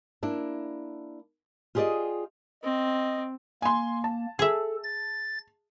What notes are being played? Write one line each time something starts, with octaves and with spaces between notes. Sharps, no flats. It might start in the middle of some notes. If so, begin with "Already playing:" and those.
A#3 D4 E4
F4 G4 G#4 C5 D5 D#5
C4 D#5
A#3 G#5 C6
A5
G#4 A4 E5
A6